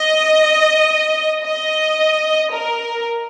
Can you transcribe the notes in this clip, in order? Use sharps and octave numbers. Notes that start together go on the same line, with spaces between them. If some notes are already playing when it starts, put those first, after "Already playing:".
Already playing: D#5
D#5
A#4